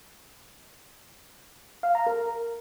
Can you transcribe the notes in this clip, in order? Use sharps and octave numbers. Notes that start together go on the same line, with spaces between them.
F5
A#5
A#4